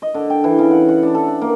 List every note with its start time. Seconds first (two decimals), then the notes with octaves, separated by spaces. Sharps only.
0.02 D#5
0.14 D3
0.30 G5
0.44 E3
0.59 C#3
0.71 F#5
0.89 F#5
1.03 D4
1.15 A4
1.28 F#5
1.42 A#3